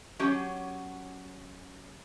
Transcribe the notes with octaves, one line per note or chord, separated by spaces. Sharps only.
F#3 C#4 G4